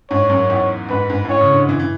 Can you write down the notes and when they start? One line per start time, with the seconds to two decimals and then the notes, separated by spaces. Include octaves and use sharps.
0.10 G#2 C#5
0.30 F#2
0.50 E2
0.90 G#2 B4
1.10 G#2
1.25 G#2
1.29 A2 C#5
1.41 C#3
1.49 D3
1.69 E3
1.79 E3